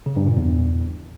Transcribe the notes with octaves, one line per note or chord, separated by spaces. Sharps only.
C#3
G2
A#2
E2